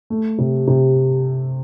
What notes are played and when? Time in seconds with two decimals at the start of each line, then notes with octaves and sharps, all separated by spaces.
0.10 A3
0.38 C3
0.67 C3